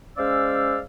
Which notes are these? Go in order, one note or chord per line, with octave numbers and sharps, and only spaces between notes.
G#3 C#4 C5 D5 F5 E6